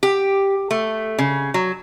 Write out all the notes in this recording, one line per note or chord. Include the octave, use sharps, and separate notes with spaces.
G4
A3
C#3
F#3